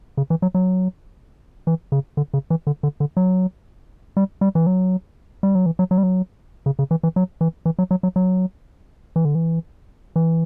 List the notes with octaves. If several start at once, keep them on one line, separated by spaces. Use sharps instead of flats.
C#3
E3
F#3
F#3
E3
C#3
D3
C#3
E3
D3
D3
D3
F#3
G3
G3
E3
F#3
G3
F#3
E3
F#3
F#3
G3
F#3
C#3
C#3
E3
E3
F#3
E3
E3
F#3
F#3
F#3
F#3
E3
D3
E3
E3